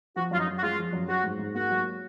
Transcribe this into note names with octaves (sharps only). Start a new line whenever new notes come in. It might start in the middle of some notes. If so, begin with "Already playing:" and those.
F3 F#4
F#2 F4
D#4
F#2
F#4
G#3 F4
F3
F#2
F#3 F#4
G#2
G#2
A#3 F#4
F#3